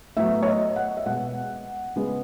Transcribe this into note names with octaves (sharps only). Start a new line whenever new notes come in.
A2 F#3 B3 E5
C#5
D#5
F#5
E5
B2 G#3 B3 F#5
C#3 G#3 B3